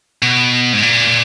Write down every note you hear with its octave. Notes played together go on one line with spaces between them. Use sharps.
B2
G#2
A#2